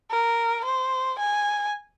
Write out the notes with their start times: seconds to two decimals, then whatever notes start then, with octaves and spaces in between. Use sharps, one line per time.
0.11 A#4
0.65 C5
1.19 G#5